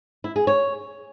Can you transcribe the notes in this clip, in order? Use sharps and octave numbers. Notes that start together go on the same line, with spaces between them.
E4
G#4
C#5